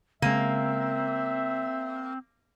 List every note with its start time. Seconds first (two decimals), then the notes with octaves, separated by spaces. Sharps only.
0.22 C#3 G#3 A#3 C4 E5